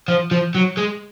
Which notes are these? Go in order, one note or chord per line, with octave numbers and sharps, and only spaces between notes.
F3
F3
F#3
G#3